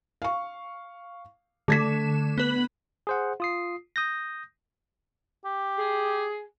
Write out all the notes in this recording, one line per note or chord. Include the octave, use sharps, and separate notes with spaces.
F5 C#6
D3 A3 G#6 B6 E7
B3 B4 F#7
G#4 C5 F#5
F4 D#6 C7
D#6 G6 A#6
G4
G#4